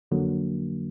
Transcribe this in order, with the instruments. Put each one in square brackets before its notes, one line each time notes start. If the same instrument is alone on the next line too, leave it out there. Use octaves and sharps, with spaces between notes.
[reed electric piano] F2 D3 F#3 A#3